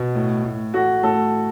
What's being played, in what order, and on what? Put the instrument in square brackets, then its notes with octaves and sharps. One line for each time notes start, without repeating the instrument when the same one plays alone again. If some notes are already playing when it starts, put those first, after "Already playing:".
Already playing: [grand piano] B2
A2
A2
[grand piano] A3 [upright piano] F#4
[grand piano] A2 [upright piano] A4